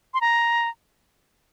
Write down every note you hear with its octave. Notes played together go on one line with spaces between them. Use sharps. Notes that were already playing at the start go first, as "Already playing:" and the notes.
C6
A#5